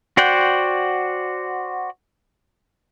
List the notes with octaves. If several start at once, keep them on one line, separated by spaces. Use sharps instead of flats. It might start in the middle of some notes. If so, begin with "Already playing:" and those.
F#4 C5 D5 F#5 G5